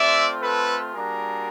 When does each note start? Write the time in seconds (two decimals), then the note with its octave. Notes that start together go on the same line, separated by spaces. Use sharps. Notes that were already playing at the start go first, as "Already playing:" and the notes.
Already playing: A3 C4 F4 D5 E5
0.42 A4 B4
0.93 G3 A#3 D4 F#4 G#4 A#4